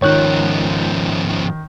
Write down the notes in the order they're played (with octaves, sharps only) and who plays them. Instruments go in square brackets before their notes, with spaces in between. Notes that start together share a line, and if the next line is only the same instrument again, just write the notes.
[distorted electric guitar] G#2 F3 [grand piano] D#3 [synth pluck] C#5 F#6